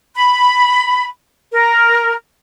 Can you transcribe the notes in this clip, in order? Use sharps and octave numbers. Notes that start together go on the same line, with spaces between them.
B5
A#4